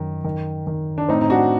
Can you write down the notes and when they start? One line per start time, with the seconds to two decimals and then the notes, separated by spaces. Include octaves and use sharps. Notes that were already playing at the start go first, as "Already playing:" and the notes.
Already playing: F#2 D#3
0.24 D#3
0.67 D#3
0.98 D4
1.08 A2 C4 D#4
1.21 D#4
1.30 D4 F#4